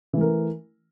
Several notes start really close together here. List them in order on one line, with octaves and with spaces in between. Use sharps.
E3 A3 A#4